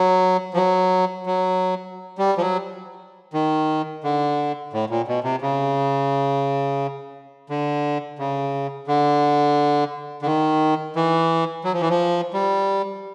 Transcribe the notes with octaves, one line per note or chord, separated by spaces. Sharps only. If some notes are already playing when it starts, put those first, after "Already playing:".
Already playing: F#3
F3
F#3
F#3
G3
F3
F#3
D#3
D3
A2
A#2
B2
C3
C#3
D3
C#3
D3
D3
D#3
E3
F#3
F3
E3
F3
G3